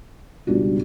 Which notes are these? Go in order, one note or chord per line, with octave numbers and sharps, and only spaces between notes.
C#2 B2 G3 D4 F#4